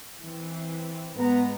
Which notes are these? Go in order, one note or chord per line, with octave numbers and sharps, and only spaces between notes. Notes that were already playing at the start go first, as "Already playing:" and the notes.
E3 C4
G#2 G#3 B3 A#5